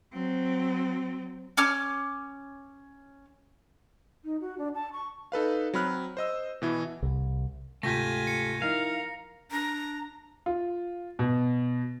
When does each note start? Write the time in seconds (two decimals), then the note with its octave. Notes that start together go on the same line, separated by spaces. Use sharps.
0.13 F#3 C4
1.57 C#4 D6 F6
4.25 D#4
4.41 F#4
4.58 D4
4.75 A5
4.93 C#6
5.32 D#4 A4 B4 F5
5.74 F#3 C4 B5 F6 F#6
6.17 C5 D#5 E6
6.62 B2 E3 E4
7.02 C2
7.83 D2 G#2 C3 A3 F4 G4 G#5 A#6
8.27 C#7
8.62 F3 D#4 E4 A#4 F5
9.52 D4 A#5
10.46 F4
11.19 B2